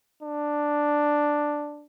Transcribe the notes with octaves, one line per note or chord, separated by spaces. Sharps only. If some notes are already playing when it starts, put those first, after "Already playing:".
D4